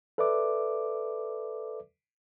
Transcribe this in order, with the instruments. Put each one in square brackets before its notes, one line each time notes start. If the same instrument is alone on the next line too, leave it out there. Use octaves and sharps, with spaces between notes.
[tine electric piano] A4 B4 D5 E5 D6